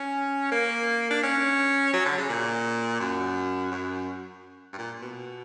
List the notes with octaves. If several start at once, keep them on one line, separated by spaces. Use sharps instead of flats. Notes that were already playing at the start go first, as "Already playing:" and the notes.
Already playing: C#4
A#3
D4
C#4
F#3
D3
C#3
A#2
F#2
F#2
G2
A#2
B2